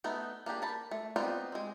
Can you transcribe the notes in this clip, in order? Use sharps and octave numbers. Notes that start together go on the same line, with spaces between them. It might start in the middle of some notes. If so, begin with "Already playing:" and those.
A3 B3 D#4
A#3 D4 G4 G#4
A#4 A5 B5
A3
B3 C4 D#4 F4 D5
G#3 C4